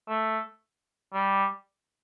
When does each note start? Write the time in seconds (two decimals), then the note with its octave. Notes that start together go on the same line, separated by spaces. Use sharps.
0.09 A3
1.13 G3